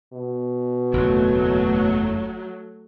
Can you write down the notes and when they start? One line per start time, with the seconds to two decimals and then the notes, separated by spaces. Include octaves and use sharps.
0.13 B2
0.93 F#1 E2 F#3 A3